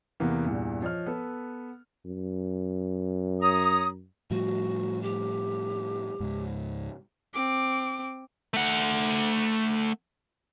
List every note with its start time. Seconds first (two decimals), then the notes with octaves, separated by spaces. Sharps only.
0.20 E2 C3 E3 A#3 B3
0.45 E2 G2 A#2 E3
0.82 F3 C#5 D#5 F6
1.06 B3 A4 B4
2.06 F#2
3.41 C#5 A#5 D#6
4.31 A2 F3 G3 F#4
5.02 G4
6.20 C#2 G#2
7.34 C4 D6
8.54 A3 F#5